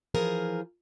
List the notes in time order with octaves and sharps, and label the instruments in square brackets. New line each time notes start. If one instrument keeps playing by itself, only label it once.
[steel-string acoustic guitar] E3 F3 G#4 A#4